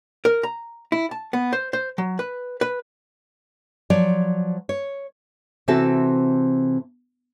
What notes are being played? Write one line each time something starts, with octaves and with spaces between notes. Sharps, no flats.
A#4
A#5
E4
A5
B3
C5
C5
F#3
B4
B4
F3 F#3 C#5 D5
C#5
C3 E3 C4 F#4 A4